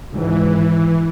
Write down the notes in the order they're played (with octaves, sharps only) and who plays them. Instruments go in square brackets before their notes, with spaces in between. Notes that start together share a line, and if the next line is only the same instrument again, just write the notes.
[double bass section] G#1 C#2 G#2 [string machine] E3